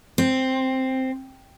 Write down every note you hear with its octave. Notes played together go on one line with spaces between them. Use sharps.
C4